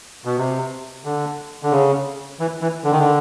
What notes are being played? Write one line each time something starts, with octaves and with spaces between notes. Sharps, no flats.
B2
C3
D3
D3
C#3
E3
E3
D3
D#3
D3